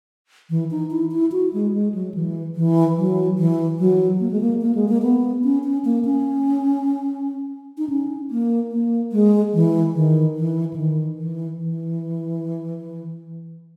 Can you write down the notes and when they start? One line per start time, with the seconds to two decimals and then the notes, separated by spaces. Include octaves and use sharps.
0.50 E3
0.71 D#4
0.91 E4
1.11 E4
1.32 F#4
1.53 G#3
1.74 G#3
1.94 F#3
2.14 E3
2.56 E3
2.97 F#3
3.38 E3
3.79 F#3
4.20 A#3
4.31 G#3
4.41 A#3
4.61 A#3
4.75 G#3
4.88 A#3
5.02 B3
5.44 C#4
5.64 C#4
5.85 A#3
6.05 C#4
7.78 D#4
7.90 C#4
8.31 A#3
8.72 A#3
9.12 G#3
9.54 E3
9.95 D#3
10.36 E3
10.74 C#3
10.77 D#3
11.18 E3
11.59 E3